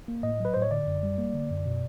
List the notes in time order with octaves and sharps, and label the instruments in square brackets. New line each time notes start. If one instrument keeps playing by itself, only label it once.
[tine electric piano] A#3
A2 D#5
F#3 B4
A2 C5
C#5
D3 D5
F#2
G3
A#3
D3
F#2
B2